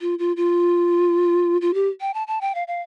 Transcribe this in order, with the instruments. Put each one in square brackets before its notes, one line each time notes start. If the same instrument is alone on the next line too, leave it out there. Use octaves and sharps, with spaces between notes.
[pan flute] F4
F4
F4
F4
G4
G5
A5
A5
G5
F5
F5